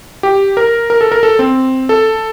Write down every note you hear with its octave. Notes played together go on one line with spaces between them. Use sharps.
G4
A#4
A#4
A4
A#4
A4
C4
A4